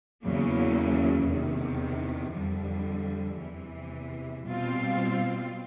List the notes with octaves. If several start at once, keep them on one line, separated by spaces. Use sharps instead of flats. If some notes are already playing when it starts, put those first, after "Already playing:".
E2 C#3 F#3 A#3
E2 C3 D#3
F2 D3 G3
E2 C3 E3
B2 G3 C4 F4